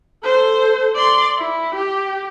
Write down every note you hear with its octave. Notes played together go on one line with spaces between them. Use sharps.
A4 C5
D5 C6
E4
G4